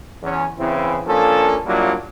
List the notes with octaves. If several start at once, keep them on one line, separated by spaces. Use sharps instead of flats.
E2 C#4
C#3 E3 C4 E4
F3 A#3 C#4 D4 A4
F#3 G3 A#3 D4 E4 F4